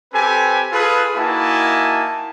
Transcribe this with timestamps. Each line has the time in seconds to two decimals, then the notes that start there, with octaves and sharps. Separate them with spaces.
0.13 C4 G4 A4 B4 G#5
0.72 F4 G#4 A4 B4
1.16 A#3 D#4 E4 F#4 G#5 A5